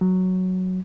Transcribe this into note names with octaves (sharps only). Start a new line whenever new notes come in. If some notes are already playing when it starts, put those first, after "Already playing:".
F#3